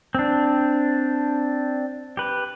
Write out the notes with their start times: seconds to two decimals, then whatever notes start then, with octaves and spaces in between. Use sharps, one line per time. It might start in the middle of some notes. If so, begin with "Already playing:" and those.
0.15 C4 D4
2.17 G4 B4